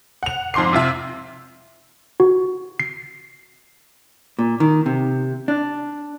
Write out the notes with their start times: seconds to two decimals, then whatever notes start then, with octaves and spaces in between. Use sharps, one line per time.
0.23 F#5 F7
0.54 F2 G#2 C6 D6 C7
0.73 C3 F4 E5
2.20 F#4
2.80 C7
4.39 A#2
4.60 D#3
4.86 C3
5.48 D4